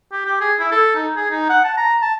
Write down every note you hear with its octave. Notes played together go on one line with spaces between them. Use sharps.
G4
G4
G#4
E4
A4
D#4
G#4
D#4
F#5
A5
A#5
A5